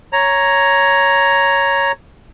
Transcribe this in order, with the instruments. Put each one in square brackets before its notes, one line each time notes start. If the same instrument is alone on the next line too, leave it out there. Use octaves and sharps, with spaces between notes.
[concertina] C#5 A#5